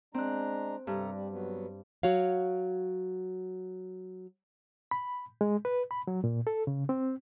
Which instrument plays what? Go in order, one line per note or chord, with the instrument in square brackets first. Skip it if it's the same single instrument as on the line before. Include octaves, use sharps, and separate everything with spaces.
[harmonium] G#3 D4 A#5 [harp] C4 F#6
[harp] G2 [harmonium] C3 A4 A#5
[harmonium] G3
F#3 B3
[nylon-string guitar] F#3 F#4 C#5 F5
[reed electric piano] B5
G#3
B4
B5
F#3
A#2
A4
C#3
C4